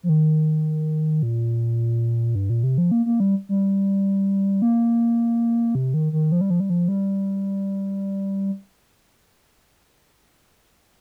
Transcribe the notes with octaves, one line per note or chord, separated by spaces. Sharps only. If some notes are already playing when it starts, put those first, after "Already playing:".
F3
D#3
A#2
G2
A#2
C3
F3
A#3
A#3
G3
G3
A#3
C3
D#3
D#3
F3
G3
F3
G3
F3
G3